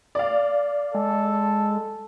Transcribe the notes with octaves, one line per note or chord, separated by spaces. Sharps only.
D5 F5
G#3 A4